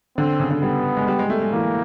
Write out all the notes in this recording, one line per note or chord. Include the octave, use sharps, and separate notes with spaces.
D3 C4
C#3
D3
G3 B3
G#3
G3
G#3
A3
G#3
E3 A#3